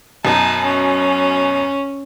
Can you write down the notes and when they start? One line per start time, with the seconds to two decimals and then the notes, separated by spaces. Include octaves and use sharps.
0.25 F#2 B2 D#4 A5
0.64 C#4